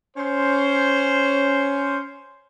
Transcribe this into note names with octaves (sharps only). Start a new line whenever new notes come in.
C#4 C5